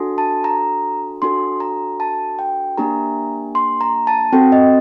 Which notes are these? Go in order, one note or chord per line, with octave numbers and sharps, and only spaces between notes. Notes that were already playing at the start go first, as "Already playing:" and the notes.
Already playing: D4 F#4 A4
A5
A#5
D4 F#4 A4 C6
A#5
A5
G5
A#3 D4 G4 A#5
C6
A#5
A5
C4 F#4 A4 G5
D#5